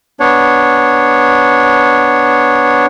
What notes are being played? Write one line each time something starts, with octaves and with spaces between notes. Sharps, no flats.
B3 D4 C#5